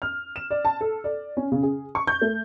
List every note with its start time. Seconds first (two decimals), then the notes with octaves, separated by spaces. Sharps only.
0.02 F6
0.36 E7
0.51 D5
0.65 A5
0.81 A4
1.04 D5
1.37 C#4
1.52 C#3
1.63 G#4
1.95 C#6
2.07 G6
2.21 A3